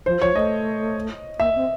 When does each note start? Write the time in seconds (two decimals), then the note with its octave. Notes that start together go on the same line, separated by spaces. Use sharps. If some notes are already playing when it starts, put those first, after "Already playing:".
0.06 F3 C5
0.22 F3 C#5
0.36 A3 D#5
1.39 A#3 E5
1.55 C4